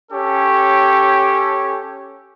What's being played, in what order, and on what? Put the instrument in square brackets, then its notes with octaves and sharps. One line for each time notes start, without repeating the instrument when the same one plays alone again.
[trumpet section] C#4 G4 A4 C#5